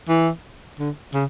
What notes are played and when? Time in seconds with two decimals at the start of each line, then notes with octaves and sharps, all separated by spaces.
0.09 E3
0.79 D3
1.14 C#3